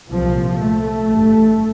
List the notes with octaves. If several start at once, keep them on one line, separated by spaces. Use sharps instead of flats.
C2 A#2 F3
A3
A1 G2